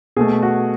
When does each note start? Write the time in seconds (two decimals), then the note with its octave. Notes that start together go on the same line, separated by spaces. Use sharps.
0.16 B2 A3 G#4
0.42 F#4